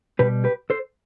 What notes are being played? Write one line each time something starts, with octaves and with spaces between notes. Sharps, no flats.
B2 G3 G4 B4
G4 B4
A4 C5